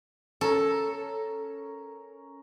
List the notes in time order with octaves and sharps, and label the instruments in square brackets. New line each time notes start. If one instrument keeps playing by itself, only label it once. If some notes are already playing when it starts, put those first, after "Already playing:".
[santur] C#4 A#4 C#6 [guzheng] A4